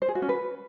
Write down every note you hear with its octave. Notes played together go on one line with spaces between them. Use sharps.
C5
G#4
F#4
C#4
B4